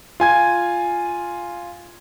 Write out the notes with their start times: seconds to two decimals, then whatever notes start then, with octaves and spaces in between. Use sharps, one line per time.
0.20 F4 G#5 G#6